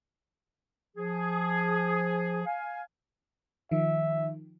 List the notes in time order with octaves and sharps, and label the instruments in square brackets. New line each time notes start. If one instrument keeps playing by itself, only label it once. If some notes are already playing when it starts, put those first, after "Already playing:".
[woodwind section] F3 G#4
F5 G#5
[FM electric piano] D#3 F3 [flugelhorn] E5